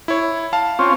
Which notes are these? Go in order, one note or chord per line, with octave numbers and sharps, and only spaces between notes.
E4 C#5
F5 A5
C4 C#4 F4